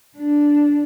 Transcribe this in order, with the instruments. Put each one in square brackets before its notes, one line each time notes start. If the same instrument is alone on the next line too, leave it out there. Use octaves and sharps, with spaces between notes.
[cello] D4